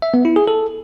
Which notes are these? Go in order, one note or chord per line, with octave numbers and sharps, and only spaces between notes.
E5
B3
E4
G#4
A4